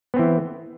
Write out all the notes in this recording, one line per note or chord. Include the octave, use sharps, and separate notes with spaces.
E3 B3 C4